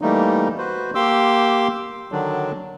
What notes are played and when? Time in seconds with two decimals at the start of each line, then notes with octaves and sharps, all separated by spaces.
0.01 E3 G3 A3 A#3 D#4
0.58 F#4 B4 C5
0.95 A#3 G4 C6 D6 E6
2.12 D3 D#3 F#3 D4